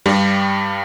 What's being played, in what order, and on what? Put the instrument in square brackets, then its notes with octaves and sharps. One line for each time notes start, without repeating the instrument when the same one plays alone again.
[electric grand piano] G2 G3